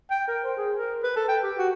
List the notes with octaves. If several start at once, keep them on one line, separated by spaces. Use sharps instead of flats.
G5
A#4
C5
G#4
A#4
B4
A4
G5
G4
F#4